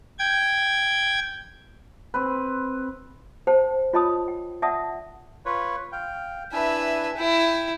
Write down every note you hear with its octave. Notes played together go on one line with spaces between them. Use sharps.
G5 G#6
C4 B4
C5 G5 A5
F4 C#5 D#5 A5 B5 D#6
G5
D5 E5 F#5 A5 D#6
F4 B4 C#5
F5 G5
D4 E4 B4 E5 G#5
E4 G5